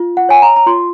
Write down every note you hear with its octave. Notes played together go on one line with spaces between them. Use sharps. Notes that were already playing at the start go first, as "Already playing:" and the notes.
Already playing: F4
F#5
C#5 G#5
A#5
A#5
F4 C6